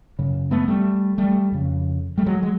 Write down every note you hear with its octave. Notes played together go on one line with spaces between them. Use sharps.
F#2 C#3
A3 B3
G3 A3
G3 A3
F2 C#3
G3 A3
F#3 G#3
F#3 G#3